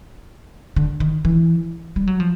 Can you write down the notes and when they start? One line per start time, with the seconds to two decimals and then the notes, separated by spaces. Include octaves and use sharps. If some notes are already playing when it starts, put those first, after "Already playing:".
0.76 D3
1.00 D#3
1.25 E3
1.96 G3
2.07 F#3
2.20 F3